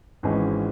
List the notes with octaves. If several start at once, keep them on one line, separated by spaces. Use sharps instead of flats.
G#1 G#2 E3 G#3 C#4